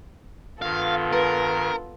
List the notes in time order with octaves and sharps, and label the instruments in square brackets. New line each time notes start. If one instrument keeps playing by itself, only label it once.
[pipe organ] G2 D#3 [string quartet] B3 F4 A4 [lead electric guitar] F5
[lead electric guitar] A#4 [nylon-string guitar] B4